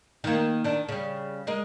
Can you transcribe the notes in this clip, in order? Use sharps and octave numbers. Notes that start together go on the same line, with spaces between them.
D#3 A#3
D#3 D4
C#3 G3
G#3 A#4 D#5